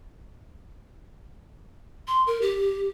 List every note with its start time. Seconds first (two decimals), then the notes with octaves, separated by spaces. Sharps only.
2.08 C6
2.27 A#4
2.42 G4